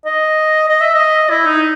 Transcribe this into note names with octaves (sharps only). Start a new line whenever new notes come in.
D#5
D#5
E5
D#5
E4
D#4